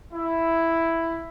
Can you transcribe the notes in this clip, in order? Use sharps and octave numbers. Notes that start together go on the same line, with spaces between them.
E4